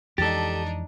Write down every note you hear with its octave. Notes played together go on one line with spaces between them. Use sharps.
F2 E3 G#3 D4 D#4 G4 A4 A6